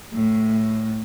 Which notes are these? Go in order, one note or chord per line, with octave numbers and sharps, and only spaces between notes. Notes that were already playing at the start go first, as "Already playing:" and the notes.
A2